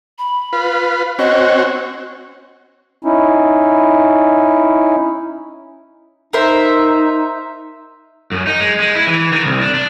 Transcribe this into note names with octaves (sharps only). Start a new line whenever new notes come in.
B5
F4 B4
C4 C#4 F#4 D#5
C#4 D#4 E4
D#4 A#4 C5 E5
F#2
D#4
G#3
G#3
E4
E3
D#3
C2
D4
D4